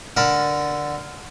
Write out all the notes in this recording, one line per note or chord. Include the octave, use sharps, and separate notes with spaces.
D3 A#4 A5 B5